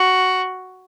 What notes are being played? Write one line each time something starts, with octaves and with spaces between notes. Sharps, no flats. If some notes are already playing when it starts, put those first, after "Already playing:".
Already playing: F#4